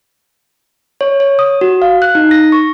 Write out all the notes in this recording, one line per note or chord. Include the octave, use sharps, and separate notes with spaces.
C#5
C#5
D#6
F#4
F5
F#6
D#4
A#6
C#6